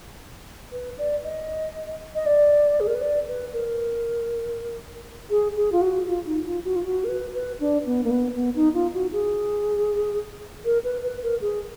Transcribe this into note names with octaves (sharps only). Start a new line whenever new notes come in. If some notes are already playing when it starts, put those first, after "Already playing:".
B4
D5
D#5
D#5
D5
G#4
A#4
B4
D5
B4
A#4
G#4
G#4
F4
F#4
F4
D#4
F4
F#4
F4
F#4
A#4
B4
B4
D4
B3
A#3
B3
B3
D#4
F4
F#4
G#4
A#4
B4
B4
A#4
G#4